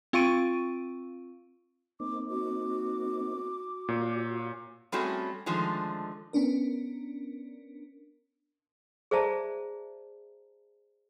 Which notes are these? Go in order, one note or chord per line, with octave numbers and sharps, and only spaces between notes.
C4 F4 F5 C#6 D7 D#7
A#3 C4 D#4 D6
F#4 D6
A#2 F4 F#4 C#5
G3 A3 C4 C#4 F#4 G#4
D3 D#3 F3 G#3 A3
B3 C#4 D4 A#4
G#4 C5 D5 E5 A5 A#5